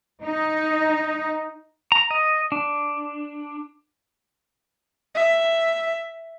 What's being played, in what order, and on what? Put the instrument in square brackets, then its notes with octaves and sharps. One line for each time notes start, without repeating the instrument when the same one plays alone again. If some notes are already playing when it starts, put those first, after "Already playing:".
[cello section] D#4
[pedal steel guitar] A#5
D#5
D4
[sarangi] E5